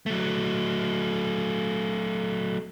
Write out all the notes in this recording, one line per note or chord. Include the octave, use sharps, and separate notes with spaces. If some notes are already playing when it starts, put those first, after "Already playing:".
F#3 A3